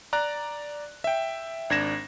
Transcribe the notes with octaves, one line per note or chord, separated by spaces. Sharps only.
D5 A#5 F#6
E5 G5
G#1 D4 G#6 A#6 E7